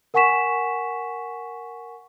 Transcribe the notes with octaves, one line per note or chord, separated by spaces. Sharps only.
A#4 F#5 G#5 C#6 B6 E7